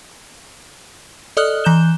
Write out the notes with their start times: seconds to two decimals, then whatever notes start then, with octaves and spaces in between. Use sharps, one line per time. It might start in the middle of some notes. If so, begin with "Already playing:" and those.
1.37 A4 D5 D#5 D#6 F6 F#6
1.64 E3 A#5 F#6 G6 E7 G7